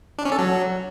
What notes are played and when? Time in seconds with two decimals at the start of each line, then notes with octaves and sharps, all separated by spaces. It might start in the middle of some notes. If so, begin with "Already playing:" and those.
0.19 D4
0.25 C#4
0.32 A4
0.39 F#3